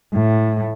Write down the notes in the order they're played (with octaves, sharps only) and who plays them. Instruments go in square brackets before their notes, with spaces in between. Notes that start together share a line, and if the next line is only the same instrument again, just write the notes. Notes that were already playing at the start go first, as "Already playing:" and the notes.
[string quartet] A2